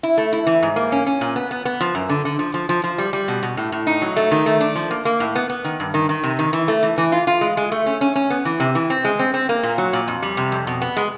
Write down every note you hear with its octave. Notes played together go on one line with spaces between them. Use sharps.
E4
A3
E4
E3
G#2
A#3
C#4
C#4
A#2
B3
B3
B3
F3
F#2
D3
D3
F3
F3
F3
F3
G3
G3
B2
B2
A2
A2
D#4
F#3
A3
D#3
A3
D4
F3
A#3
A#3
A2
B3
B3
D#3
G2
D#3
D#3
C3
D#3
E3
A3
E3
E3
F4
F4
G#3
G#3
A3
C#4
C#4
C#4
B3
E3
C3
E3
C4
G#3
C4
C4
A#3
A#2
F#3
A#2
F2
G3
C3
F2
B2
B3
G#3